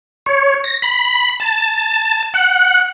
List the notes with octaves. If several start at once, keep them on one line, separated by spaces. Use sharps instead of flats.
C#5
A#6
B5
A5
F#5